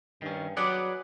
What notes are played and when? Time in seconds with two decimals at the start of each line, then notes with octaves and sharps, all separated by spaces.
0.22 G2 D#3 C#4
0.57 F#3 G#4 B4 D5 F#5